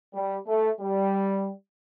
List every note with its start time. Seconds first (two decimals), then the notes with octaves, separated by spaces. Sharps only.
0.14 G3
0.47 A3
0.81 G3